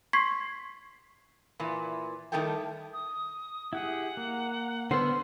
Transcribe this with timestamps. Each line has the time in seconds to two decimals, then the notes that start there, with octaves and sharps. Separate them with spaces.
0.13 C6 C#6 G#6 B6 C7
1.60 A#2 E3
2.32 D#3 G3 A3 E4 A4 G5
2.93 D#6
3.73 E4 G4 G#4 F#5
4.17 A#3
4.91 D3 B3 C5 F#5 E6 F6